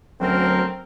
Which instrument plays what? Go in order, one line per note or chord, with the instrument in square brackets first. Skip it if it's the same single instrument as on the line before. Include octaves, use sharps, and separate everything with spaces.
[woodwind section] D2 C#4 A#4 [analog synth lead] F#3 [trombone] C4